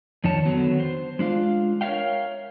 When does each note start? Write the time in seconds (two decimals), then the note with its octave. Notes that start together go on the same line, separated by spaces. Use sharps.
0.24 F2 D#3 D#4 C#5 A5
0.45 D3 D#3 F#3 B3
0.80 C5
1.19 G#3 D4 F4 F5
1.81 A#4 C#5 D5 E5 F5 G5